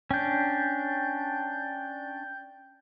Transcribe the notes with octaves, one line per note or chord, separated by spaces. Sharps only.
C#4 D4 G5 G6